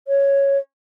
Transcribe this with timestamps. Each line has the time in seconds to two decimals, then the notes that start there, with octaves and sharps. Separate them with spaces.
0.08 C#5